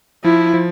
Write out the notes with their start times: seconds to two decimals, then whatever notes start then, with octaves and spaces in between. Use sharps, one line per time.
0.24 F3 E4
0.54 F3